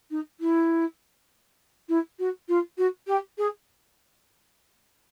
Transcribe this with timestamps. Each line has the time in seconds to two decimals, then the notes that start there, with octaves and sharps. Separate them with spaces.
0.10 D#4
0.40 E4
1.88 E4
2.19 F#4
2.48 F4
2.77 F#4
3.07 G4
3.37 G#4